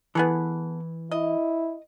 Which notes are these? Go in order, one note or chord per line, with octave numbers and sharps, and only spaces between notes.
E3 B3 G#4 A4
E4 D#5